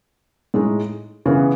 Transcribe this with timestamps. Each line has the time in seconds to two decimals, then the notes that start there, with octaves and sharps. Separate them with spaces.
0.54 A2 G#3 D#4
1.26 C#3 E3 B3